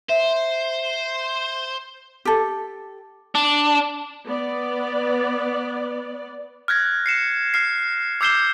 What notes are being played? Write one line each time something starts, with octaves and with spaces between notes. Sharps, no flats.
C5 E5
G4 A4
D4
B3 D5
F6 F#6 G#6 A#6
C7 C#7 E7
F6 C7
D6 E6 G6 C7 E7 G7